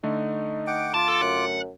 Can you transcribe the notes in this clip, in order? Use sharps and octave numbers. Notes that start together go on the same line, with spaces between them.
D3 A3 D#4
F#5 G5 D6
F4 A5 D6
A4
F#2 F#5